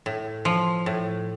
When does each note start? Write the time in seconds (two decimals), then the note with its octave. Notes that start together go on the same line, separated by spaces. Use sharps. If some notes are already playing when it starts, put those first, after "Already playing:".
0.06 A2
0.45 F3
0.86 A2